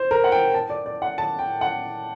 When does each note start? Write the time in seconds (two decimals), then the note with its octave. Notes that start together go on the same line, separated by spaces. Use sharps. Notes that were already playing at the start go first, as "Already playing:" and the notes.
Already playing: C5
0.11 A#4
0.24 F#5
0.32 G5
0.54 A5
0.70 D5
0.86 D5
1.02 F#5
1.18 A5
1.39 G5
1.61 F#5